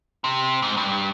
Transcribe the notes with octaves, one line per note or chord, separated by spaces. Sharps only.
C3
G#2
G2